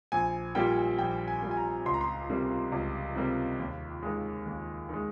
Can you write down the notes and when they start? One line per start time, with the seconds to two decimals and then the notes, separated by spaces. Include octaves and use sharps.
0.12 A#1 G#5
0.55 A#2 G3 A#3 G5
0.98 A#1 G5
1.28 G#5
1.42 A#2 G3 A#3
1.51 G#5
1.57 A#5
1.86 C#2 C6
1.94 A#5
2.01 C6
2.29 C3 G3 A#3
2.72 C#2
3.15 C3 G3 A#3
3.59 D#2
4.03 D#3 G#3
4.46 D#2
4.89 D#3 G#3